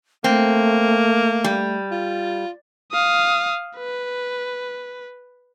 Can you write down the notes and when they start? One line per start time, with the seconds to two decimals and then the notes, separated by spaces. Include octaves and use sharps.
0.24 A3 A#3 C4
1.44 G3
1.91 F4
2.93 F5 D#6
3.77 B4